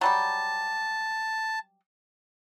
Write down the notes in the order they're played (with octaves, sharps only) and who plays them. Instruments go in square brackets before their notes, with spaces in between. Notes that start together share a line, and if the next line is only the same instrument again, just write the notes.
[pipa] F#3 G3 G4 [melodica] A5